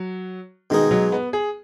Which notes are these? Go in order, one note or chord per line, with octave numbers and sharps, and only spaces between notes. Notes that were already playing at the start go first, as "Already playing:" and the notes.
Already playing: F#3
B2 D#3 G#3 D#4 G#4
F#3
B3
G#4